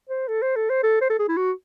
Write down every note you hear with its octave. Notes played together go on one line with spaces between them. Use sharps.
C5
A4
C5
A4
C5
A4
C5
A4
G#4
E4
F#4